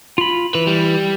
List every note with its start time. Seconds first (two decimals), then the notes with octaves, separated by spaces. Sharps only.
0.18 F4 B5
0.55 E3 B4
0.67 G3